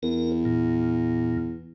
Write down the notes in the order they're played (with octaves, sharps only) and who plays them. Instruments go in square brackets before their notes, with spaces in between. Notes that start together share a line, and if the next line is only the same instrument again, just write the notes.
[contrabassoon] E2 [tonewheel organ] A#4
[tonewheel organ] A#2